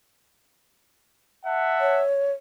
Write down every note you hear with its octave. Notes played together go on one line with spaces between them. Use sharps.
E5 F#5 A5
C#5